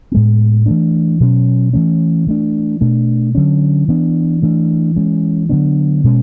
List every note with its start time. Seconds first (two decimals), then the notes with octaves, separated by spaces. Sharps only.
0.12 A2 G#3 B3
0.66 E3 A3 D4
1.20 B2 F#3 C#4
1.73 E3 A3 C#4
2.27 E3 A3 D4
2.81 B2 A3 D4
3.35 D3 F#3 C#4
3.88 E3 B3 D4
4.42 E3 A3 D4
4.96 E3 G#3 C#4
5.49 D3 F#3 B3 D4
6.04 B2 G#3 C#4